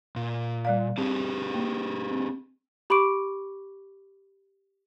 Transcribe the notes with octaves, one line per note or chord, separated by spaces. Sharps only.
A#2
G3 D5 F5
C4 D4 G4 G#4
A#3
C4
G4 B5 C#6 D6 D7